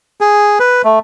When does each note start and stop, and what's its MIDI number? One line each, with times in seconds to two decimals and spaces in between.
0.21 0.59 68
0.60 0.82 71
0.84 0.99 57